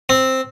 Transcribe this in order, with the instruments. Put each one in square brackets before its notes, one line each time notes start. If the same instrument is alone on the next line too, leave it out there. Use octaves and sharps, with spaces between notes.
[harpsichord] C4